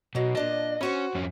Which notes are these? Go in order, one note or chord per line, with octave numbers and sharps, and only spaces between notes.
B2 F#3 D#4
A#2 D4 D#5 A5
C#4 E4 F#4 C5
F2 C#4